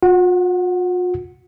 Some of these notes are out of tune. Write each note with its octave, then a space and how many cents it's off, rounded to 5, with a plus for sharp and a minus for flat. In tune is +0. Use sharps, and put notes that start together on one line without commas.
F4 +45 F#5 +0